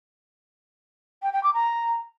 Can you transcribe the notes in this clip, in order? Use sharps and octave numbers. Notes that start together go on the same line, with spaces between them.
G5
G5
D6
A#5